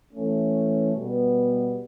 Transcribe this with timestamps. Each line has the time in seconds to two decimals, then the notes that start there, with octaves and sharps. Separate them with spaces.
0.12 E3 A3 C#4
0.95 B2 G3 B3